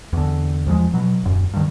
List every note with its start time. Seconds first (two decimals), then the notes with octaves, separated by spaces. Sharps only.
0.13 E2 D3
0.66 E2 F3 G3 G#3
0.93 B2 F#3
1.24 D#1 F#2
1.54 G2 D#3